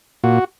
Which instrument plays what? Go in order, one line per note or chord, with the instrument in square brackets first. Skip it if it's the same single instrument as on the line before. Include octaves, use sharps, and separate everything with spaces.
[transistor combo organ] A#2 F#4